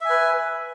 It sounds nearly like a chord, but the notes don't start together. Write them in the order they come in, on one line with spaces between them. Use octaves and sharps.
E5 G#5 B4